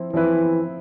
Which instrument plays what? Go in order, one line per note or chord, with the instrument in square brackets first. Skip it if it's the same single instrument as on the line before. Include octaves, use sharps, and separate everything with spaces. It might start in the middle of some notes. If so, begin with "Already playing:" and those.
Already playing: [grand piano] F3 C4 E4
[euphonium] E3 [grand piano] F3 C4 E4 B4